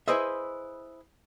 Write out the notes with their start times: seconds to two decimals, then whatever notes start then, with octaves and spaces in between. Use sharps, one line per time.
0.08 E4 G#4 B4 C5 D#5 E5